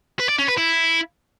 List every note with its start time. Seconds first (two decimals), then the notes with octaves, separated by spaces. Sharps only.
0.20 B4
0.29 D5
0.39 C#4
0.48 B4
0.58 E4